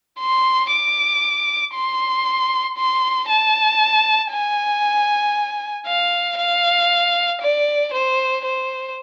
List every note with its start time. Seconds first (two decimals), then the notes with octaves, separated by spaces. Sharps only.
0.20 C6
0.71 D6
1.74 C6
2.78 C6
3.29 A5
4.32 G#5
5.87 F5
6.39 F5
7.42 D5
7.93 C5
8.45 C5